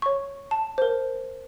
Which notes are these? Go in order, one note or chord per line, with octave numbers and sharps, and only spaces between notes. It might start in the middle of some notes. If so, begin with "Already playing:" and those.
C#5 C#6
A5
A#4 C5